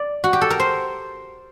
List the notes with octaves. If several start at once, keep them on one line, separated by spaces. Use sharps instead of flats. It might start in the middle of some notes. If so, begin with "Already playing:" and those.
Already playing: D5
F#4
G4
A4
A#4
C5